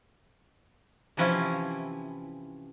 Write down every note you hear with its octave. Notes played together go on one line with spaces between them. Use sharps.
C3 E3 F3 C#4 E4